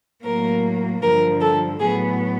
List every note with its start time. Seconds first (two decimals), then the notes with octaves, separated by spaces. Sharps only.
0.24 A2 F#3 A#3 A#4
1.02 G2 D3 F3 A#4
1.41 A4
1.80 A2 F#3 B3 G#4